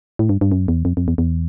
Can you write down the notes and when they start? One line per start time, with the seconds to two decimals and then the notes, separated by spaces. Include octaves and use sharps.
0.19 A2
0.29 G2
0.41 G2
0.52 F#2
0.68 E2
0.85 F2
0.97 F2
1.08 E2
1.18 E2